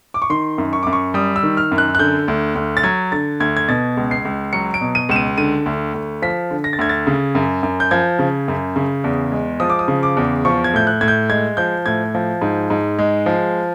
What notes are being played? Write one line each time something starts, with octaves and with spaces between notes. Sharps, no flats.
D6
C#6
D#3 C6
F#2
C#6
F#2 D6
C#6
G3 D#6
E6
D#3
F6
F#2
F#6
F#6
D3 G6
D2
D2
A6
F#3 G#6
D3 A6
D2 G#6
G#6
B2 A6
C#2
C7
C#2
F#3 C#7
D7
B2
D#7
C#2 E7
D#7
D3 D#7
D2
D2
F3 B6
D3
A#6
A6
D2 G#6
A6
C#3
F#2
F#2
G6
F3 G#6
C#3
F#2
C#3
E2
G#3
F3 D#6
D6
D#6
C#3
D6
E2
F3 C#6
G#6
A2 G6
F#6
A2 G#6
G6
G#3 G#6
F3 G6
A2 G#6
F3
G#2
G#2
G#3
F3